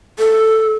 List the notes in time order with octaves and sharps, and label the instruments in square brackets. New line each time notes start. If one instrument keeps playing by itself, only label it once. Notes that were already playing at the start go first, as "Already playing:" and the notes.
[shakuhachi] A4